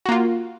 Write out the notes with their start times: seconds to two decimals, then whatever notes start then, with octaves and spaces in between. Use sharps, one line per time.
0.06 F#4
0.09 A#3
0.12 F4